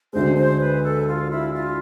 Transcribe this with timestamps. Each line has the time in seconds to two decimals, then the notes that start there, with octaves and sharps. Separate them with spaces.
0.13 D2 D3 G#3 C5
0.36 C5
0.60 B4
0.83 A4
1.07 F4
1.31 E4
1.53 F4